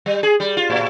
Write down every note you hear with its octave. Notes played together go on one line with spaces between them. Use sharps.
G3
G#4
G3
F4
A2